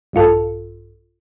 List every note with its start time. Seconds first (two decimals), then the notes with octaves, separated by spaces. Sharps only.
0.13 A#1 G2 F4 A4